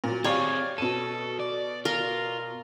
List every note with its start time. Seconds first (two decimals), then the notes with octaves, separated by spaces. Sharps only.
0.04 A#2 F#3
0.24 C4 G4 G#4 C#5 D5 F5
0.78 B2 A4 D#7
1.40 D5
1.85 F4 A#4